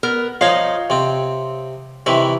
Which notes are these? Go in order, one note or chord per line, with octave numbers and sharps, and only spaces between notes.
B3 A#4
F3 D#4 C#5 D#5 F5
C3 C4
C3 D#3 E3 E5